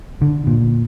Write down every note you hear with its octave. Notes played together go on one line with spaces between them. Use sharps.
D3
A#2